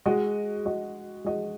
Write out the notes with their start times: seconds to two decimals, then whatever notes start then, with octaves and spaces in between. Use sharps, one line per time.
0.06 G#3 F#4 D#5
0.65 G#3 F#4 D#5
1.25 G#3 F#4 D#5